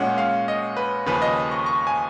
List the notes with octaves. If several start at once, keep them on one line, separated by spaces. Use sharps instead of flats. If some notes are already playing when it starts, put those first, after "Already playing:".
Already playing: A#2 G#3 C#4 F#5
F5
D#5
B4
D#2 C#3 F3 B4
D#5
C#6
C#6
G#5